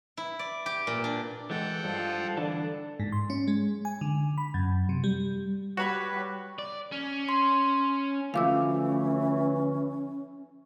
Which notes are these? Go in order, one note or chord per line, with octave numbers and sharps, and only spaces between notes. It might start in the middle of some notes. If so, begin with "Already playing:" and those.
E4
D5
G4
A#2
D4
E3 G#3 A4 F#5 G5
G2 F3
D3 E3 D4 A4
G#2
C6
C#4
G#3
G#5
D3
B5
F#2
C3
G3
G3 F#4 G4 B4 C#5 B5 C#6
D5
C#4
C6
D2 E3 F3 A3 C#4 F5 D6 E6